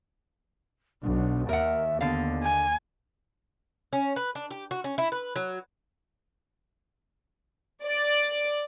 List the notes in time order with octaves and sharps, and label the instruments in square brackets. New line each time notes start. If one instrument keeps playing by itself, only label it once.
[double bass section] B1 [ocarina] D4
[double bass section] D#2 [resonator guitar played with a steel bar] A#4 F#5 [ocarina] E5
[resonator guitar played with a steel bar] D3 F5 [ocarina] B3
[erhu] G#5
[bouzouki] C#4
B4
D4
G4
F#4
C#4
E4
B4
F#3
[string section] D5